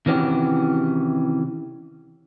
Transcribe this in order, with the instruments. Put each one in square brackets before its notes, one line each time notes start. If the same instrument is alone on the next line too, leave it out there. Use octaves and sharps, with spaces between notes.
[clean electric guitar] C3 D#3 E3 C#4 F#4 G4